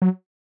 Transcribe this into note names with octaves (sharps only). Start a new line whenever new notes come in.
F#3